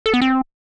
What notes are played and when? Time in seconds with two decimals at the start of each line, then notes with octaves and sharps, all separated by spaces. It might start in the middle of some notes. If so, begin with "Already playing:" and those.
0.06 A4
0.14 B3
0.22 C4